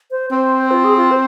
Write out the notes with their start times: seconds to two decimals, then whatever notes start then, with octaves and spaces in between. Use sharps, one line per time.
0.11 C5
0.31 C4 C5
0.71 F4
0.84 G#4
0.97 F4
1.11 C5